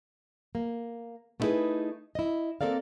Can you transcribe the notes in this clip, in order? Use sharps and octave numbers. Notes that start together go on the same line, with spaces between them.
A#3
A3 B3 D#4 E4 G#4 B4
E4 D#5
A#3 C4 A4 A#4 D5 F5